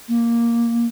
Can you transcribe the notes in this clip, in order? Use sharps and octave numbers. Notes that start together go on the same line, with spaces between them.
A#3